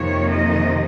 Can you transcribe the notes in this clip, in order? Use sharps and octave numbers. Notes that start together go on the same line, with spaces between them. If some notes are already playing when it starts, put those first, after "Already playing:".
Already playing: F2 C3 D#3 A#3 C#5
D#5